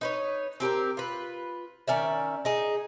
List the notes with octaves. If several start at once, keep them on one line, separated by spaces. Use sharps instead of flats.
D#4 B4 C#5
C4 G4 A4 A#4
F4 B4
D#3 C#4 D5 E5
D#4 G#4